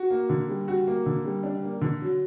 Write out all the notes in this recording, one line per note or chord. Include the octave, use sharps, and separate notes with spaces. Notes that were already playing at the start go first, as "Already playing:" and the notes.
Already playing: F#4
A#3
D3
G3
F#4
A#3
D3
G3
D4
A#3
D3
F#3